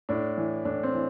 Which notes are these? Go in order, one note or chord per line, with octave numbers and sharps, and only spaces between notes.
A2 D4
E3
A2 D4
C4
E3